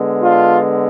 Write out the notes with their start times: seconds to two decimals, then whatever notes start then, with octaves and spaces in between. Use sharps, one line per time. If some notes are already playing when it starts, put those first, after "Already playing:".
Already playing: D3 G#3 B3
0.22 D4 F4